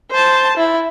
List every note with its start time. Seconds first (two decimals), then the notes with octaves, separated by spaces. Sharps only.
0.11 C5 A5
0.57 E4